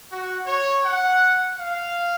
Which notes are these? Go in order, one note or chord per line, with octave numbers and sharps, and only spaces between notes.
F#4
C#5
F#5
F5